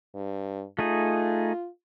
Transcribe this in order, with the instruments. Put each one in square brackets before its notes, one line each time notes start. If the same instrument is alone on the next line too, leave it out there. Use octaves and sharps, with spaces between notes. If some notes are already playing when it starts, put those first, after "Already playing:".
[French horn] G2
[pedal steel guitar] A3 D#4 G#4 [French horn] F4